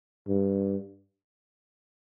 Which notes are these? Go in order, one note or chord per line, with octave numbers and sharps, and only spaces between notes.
G2